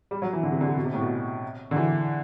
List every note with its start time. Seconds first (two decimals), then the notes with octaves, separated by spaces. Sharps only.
0.11 G3
0.22 F#3
0.33 E3
0.43 D3
0.51 C3
0.61 D3
0.68 C3
0.77 B2
0.84 C3
0.93 A2
1.01 B2
1.71 D3
1.76 E3